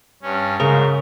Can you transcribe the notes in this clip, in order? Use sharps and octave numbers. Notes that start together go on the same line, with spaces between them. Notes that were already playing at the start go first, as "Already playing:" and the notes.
G2 C#4
G#2 C#3 A#4